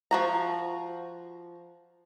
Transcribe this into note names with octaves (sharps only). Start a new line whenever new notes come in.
F3 F#4 A#5